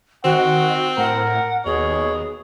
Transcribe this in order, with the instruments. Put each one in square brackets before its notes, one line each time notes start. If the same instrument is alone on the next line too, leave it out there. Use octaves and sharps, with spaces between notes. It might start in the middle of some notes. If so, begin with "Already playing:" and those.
[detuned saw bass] D#3 [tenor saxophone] C4 [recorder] F#4 [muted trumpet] F#5
[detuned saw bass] A2 [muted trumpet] A#4 [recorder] F#5
[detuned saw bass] D#2 [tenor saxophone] B2 [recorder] G#4 [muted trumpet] C#5